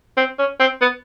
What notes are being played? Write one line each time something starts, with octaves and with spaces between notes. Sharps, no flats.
C4
C#4
C4
B3